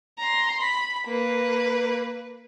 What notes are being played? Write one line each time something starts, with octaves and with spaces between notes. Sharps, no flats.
A#5 C6
B5
A#3 B4